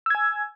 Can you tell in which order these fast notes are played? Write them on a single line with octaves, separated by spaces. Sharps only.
E6 G#6 G#5